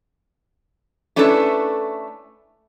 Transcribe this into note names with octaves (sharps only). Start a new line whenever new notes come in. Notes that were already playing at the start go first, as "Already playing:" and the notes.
A3 C#4 D4 E4 A4 B4